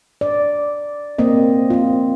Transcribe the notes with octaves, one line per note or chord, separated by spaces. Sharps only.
D5
A#3 C4 D#5
C4 F4